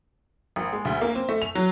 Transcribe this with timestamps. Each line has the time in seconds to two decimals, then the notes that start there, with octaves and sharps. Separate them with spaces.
0.56 G#1
0.73 G#3
0.85 D2
1.01 A#3
1.15 C4
1.29 A3
1.42 F7
1.55 F#3